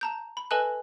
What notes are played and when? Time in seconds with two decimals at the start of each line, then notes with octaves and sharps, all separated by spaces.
0.01 A5 A#5 G6
0.37 B5
0.51 A4 B4 D#5 G#5 A5 F#6